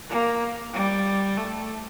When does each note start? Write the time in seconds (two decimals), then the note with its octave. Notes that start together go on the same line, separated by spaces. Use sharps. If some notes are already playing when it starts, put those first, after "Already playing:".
0.10 A#3
0.74 G3
1.37 A3